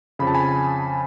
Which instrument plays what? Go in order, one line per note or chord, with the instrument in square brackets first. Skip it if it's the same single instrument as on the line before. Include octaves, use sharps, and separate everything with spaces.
[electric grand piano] F2 C#3 B5
A5
G#5 B5